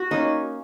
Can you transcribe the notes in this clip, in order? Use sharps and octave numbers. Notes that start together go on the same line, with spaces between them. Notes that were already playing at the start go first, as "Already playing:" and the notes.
Already playing: F#4
A#3 C#4 D#4